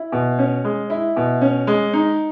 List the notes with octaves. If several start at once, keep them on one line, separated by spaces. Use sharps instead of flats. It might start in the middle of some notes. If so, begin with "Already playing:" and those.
Already playing: E4
B2
C#4
G#3
E4
B2
C#4
G#3
D#4